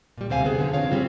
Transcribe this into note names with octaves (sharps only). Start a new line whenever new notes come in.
A#2 G3
D2 C3 C5 F5 G#5
B3 G#4
D3 D#3 F3
C#3 C4 F4 C#5 F5
G3 C4 F4